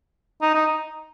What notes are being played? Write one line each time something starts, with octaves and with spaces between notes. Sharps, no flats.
D#4
D#4